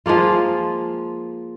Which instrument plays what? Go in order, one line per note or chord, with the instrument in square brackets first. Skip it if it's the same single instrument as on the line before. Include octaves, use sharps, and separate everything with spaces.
[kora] F3 G#3 A#3 F4